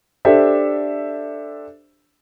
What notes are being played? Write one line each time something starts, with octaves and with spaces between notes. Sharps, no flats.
D4 G4 A4 C5 E5